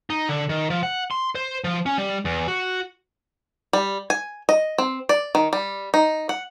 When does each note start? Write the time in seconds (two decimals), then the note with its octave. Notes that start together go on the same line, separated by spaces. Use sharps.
0.10 D#4
0.29 D3
0.49 D#3
0.70 F3
0.83 F#5
1.11 C6
1.35 C5
1.64 F3
1.86 C#4
1.98 G3
2.25 E2
2.48 F#4
3.73 G3
4.10 G#5
4.49 D#5
4.78 C4
5.09 D5
5.35 D#3
5.53 G3
5.94 D#4
6.29 F#5